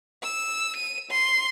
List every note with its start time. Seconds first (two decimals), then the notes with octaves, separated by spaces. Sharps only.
0.23 E6
0.76 D#7
1.11 C6